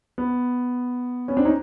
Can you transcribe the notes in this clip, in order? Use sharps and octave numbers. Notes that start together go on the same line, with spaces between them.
B3
B3 C#4
C4 D4
C#4 D#4